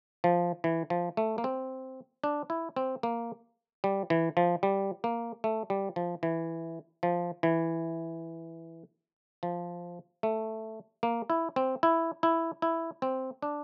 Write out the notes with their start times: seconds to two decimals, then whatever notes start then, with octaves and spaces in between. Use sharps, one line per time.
0.24 F3
0.64 E3
0.90 F3
1.17 A3
1.38 A#3
1.44 C4
2.24 D4
2.50 E4
2.76 C4
3.03 A#3
3.84 G3
4.10 E3
4.37 F3
4.63 G3
5.04 A#3
5.44 A3
5.70 G3
5.96 F3
6.23 E3
7.03 F3
7.43 E3
9.43 F3
10.23 A3
11.03 A#3
11.30 E4
11.56 C4
11.83 E4
12.23 E4
12.62 E4
13.02 C4
13.42 D4